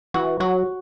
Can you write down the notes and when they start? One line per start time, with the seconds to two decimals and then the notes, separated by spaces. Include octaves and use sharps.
0.14 E3 F#4
0.40 F#3 F#4